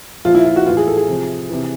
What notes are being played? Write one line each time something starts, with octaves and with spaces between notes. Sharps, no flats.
A#2 F3 F4
E4
F4
F#4
A2 E3 F4
G#4
A4
G#4
C3 F3
C3 E3